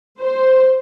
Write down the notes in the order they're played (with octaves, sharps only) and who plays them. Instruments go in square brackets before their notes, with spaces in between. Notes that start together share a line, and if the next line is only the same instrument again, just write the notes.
[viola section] C5